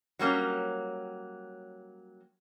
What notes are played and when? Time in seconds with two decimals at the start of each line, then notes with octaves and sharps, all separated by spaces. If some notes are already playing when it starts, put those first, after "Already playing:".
0.19 F#3 G3 A#3 C#4